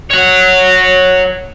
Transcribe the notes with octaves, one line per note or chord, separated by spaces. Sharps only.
C#5 F#5